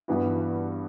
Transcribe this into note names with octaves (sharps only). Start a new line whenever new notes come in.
G2 E3 B3 F#4